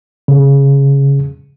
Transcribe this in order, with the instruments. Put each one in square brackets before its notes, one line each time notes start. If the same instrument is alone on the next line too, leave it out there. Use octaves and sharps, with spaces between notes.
[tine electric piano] C#3